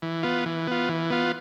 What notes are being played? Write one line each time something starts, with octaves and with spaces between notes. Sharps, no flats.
E3
B3 F4
E3
B3 F4
E3
B3 F4